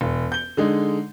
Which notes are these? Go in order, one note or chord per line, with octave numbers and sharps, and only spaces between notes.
E1
G6 G7
D3 G#3 D#4